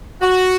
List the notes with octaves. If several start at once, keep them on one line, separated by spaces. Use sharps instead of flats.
F#4